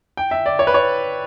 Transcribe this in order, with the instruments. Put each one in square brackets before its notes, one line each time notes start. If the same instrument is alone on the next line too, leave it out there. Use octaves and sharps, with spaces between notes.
[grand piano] G5
E5
D5
C#5
B4
C#5